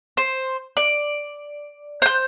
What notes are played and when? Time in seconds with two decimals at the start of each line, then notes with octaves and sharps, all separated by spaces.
0.17 C5
0.77 D5
2.02 C5 G6